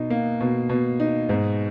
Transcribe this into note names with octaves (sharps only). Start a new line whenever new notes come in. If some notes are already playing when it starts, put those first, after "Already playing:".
Already playing: B2 D#4
A#3
B2
B2
D#4
G#2